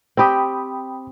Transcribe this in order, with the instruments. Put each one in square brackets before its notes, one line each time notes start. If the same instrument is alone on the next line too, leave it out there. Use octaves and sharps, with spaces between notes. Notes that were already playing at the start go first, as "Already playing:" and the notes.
[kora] C4 G4 [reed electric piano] G5 B5 D#6